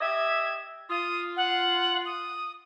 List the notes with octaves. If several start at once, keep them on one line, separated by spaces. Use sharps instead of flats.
G4 D#5 E5 G#6
F4 D#6
F#5
D#6